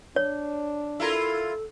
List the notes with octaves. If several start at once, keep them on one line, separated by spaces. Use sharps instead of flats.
D4 C#5
E4 F4 A4 A#4